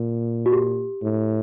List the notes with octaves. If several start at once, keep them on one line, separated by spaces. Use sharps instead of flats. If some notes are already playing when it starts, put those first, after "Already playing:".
Already playing: A#2
F#4
G4
A2